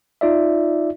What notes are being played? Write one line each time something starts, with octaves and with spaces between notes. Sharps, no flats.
D#4 F4 D5 E5